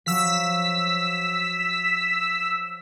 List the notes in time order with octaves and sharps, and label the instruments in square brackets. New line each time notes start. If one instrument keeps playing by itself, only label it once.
[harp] F3 F#3 [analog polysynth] E6 B6